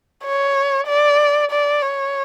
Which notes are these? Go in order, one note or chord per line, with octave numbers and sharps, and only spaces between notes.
C#5
D5
D5
C#5